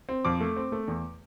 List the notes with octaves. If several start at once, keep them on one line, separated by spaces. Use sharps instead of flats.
C4
F2 D6
A3
C4
A3
E2